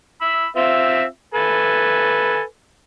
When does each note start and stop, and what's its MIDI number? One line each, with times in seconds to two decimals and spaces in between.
0.22 0.47 83
0.22 0.47 88
0.56 1.03 60
0.56 1.03 65
0.56 1.03 76
1.34 2.41 69
1.34 2.41 71
1.34 2.41 80